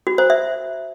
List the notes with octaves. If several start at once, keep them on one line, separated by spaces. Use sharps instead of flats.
F#4
C5
E5